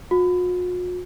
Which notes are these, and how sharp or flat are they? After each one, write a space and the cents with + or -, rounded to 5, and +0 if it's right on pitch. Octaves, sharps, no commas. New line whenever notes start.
F#4 -45